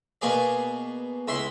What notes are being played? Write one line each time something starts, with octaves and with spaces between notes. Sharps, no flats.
B2 A#3 G#4 D5
C#2 E4 B5 C6